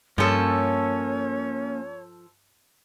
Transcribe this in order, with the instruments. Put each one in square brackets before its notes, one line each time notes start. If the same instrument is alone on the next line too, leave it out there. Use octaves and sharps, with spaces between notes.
[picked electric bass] G2 [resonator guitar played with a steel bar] F3 A4 [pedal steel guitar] A#3 C#4 [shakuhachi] C#5